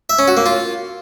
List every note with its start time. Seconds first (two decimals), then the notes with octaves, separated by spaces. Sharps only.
0.10 E5
0.19 C#4
0.28 F#4
0.37 A#3
0.46 F4